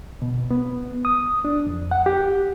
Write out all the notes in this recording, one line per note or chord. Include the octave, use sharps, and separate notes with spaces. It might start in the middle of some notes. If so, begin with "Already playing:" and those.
B2
B3
D#6
D4
F2
F#5
G4